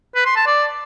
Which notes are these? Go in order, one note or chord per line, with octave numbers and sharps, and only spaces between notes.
B4
C6
A5
D5